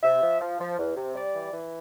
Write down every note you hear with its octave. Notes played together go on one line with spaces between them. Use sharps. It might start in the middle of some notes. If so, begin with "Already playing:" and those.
C3 E5
F3
F3
F3
E2
C3
G3 D5
E3
E3